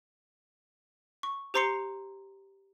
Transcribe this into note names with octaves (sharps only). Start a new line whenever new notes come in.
C#6
G4 C5 A#5 C6 C7 C#7